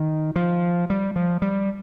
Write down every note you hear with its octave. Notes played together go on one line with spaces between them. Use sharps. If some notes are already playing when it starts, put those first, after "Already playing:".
Already playing: D#3
F3
G3
F3
G3